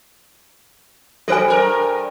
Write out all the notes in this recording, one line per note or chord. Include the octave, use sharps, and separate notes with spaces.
F#3 A4 C5 G#5
G2 A#4